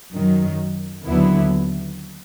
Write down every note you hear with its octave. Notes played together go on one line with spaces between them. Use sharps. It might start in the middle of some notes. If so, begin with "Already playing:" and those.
F#2 D#3 F#3
D#2 D3 F#3 B3 E4